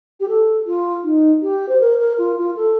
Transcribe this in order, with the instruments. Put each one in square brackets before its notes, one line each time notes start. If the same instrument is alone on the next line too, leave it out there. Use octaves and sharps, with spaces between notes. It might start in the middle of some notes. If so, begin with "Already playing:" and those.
[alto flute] G4
A4
F4
D#4
G4
C5
A#4
A#4
F4
F4
A4